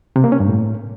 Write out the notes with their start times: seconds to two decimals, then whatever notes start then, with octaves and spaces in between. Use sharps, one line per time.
0.16 C3
0.24 A#3
0.32 C#4
0.40 G2
0.48 A2